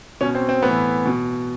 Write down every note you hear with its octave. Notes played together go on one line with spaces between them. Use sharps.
B2 C#4
C4
C4
A2 B3
E3
B2